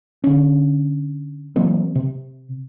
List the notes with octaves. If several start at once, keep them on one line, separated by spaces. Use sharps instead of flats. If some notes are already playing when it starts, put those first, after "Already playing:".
D3 C#4
E3 F#3 A#3 C4
C3